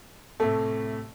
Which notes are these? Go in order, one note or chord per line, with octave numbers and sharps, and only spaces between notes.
A2 C3 A3